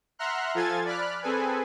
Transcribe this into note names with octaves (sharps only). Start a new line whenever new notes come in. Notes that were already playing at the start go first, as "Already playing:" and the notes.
E5 F#5 A#5 C6 F6 F#6
F3 F4 A4 G#5 G#6 A6
D5 B5 F6 F#6
C4 G#4 A4 B4 G#5